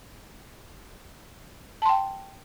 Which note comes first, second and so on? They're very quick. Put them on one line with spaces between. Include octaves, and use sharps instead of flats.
A5 C6 G5